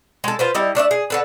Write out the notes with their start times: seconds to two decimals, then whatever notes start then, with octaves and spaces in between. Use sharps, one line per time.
0.24 G#3 A4
0.39 F4 B4 C5
0.55 G3 E4 D#5
0.75 A3 D4 D5 E5
0.91 G#4
1.10 D3 A4 B4